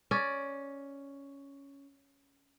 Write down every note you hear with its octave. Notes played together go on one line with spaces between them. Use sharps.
C#4 D5